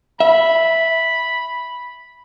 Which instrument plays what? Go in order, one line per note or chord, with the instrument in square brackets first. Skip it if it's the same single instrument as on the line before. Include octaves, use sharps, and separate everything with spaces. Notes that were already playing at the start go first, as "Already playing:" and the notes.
[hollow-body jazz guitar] E5 [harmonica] B5